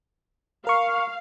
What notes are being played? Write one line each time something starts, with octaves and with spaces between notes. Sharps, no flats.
A#4 F5 C#6